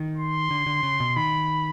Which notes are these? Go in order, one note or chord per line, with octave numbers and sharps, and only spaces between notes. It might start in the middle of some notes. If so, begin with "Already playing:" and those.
Already playing: D#3
C6
D3
D3
C#3
B2
D#3 B5